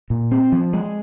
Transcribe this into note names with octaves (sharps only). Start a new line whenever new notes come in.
A#2
C4
F3
G#3